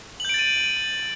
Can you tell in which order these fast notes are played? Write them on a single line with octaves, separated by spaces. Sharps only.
F#7 G6 D7 A6 D#7